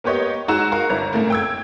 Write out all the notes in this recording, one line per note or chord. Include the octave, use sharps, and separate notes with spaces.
A#3 B3 G4 C#5 D#5
G#3 D#4 F#4 A#5 E6 E7
F#4 A#4 F5
G1 E4 B4 A#5
A2 C#3 A3 A#3
G5 E6 G#6